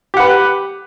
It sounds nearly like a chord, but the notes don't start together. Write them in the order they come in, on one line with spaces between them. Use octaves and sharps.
G4 F#5 B4